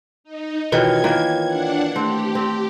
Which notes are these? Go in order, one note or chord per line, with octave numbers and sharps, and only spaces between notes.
D#4
B2 D#3 E3 F4 C#5 G5 G#6
D#3 E3 A#3
D4 F#5
A3 C4 G4
C4